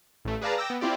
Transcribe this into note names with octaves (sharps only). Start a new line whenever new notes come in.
A1 A3
G#4 B4 D5 F5 A5 A#5
G5 D6 E6 A#6
B3
C4 E4 F4 G4 D5